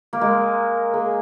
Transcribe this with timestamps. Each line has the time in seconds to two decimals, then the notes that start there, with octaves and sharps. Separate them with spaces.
0.13 A#3
0.21 G#3 A#4
0.94 A#3 G#4